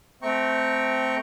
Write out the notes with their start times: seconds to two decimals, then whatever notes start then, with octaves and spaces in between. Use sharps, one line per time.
0.22 A3 C4 G5 A#5 C#6